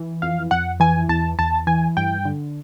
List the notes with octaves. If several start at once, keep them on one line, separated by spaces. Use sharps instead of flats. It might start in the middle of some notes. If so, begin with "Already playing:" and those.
Already playing: E3
F2 F5
F2 F#5
E3 G#5
E2 A5
E2 A5
E3 G#5
G2 G5
D3